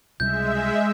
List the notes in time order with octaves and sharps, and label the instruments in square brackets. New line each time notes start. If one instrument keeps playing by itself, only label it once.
[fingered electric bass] C#2 C3 G3 [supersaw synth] G#3 E5 [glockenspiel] G6